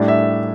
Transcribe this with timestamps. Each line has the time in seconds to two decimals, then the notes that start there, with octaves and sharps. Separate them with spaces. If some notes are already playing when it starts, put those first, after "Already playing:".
Already playing: A2 G3 D4
0.08 E5